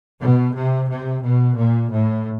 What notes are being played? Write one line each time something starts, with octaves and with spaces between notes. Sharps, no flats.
B2
C3
C3
B2
A#2
A2